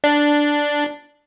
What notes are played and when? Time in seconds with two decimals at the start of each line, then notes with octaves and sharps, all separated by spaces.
0.04 D4